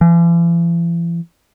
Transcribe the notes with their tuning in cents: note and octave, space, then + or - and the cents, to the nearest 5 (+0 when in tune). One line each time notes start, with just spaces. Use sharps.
E3 +45